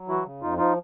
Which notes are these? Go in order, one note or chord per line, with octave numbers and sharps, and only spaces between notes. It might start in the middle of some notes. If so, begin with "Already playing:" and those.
Already playing: F#3
E3 E4 F#4
C#3
F2 D#4 F4
F3 D#4 F4